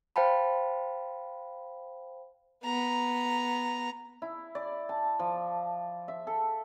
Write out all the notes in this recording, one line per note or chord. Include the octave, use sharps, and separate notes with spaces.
C5 F5 G5 A5 B5
B3 A#5
E4
D5
A5
F3
E5
A4